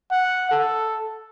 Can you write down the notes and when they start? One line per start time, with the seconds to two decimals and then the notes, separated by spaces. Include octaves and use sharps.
0.11 F#5
0.51 A4